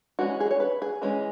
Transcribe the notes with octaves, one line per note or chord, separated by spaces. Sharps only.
E3 G#3 C#4 F#4
G#4
C#5
B4
G#4
E3 G#3 C#4